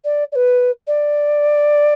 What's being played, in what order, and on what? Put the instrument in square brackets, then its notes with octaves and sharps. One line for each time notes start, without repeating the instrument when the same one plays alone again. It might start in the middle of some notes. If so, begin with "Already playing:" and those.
[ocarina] D5
D5
B4
D5